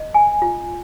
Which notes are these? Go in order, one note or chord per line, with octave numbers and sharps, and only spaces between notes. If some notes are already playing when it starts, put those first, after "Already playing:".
Already playing: D#5
G#5
F4